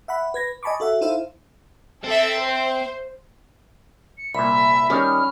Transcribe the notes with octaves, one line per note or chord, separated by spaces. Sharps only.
E5 F#5 B5
B4 G#6 A#6
D#5 G#5 A5 B5 C#6 D6
F#4 A4 E5 F#5
D#4 E4 A4 C5 E5 F5
C4 A4 E5
C5
C#7
C2 A#2 E5 B5
D#3 G3 C#4 F6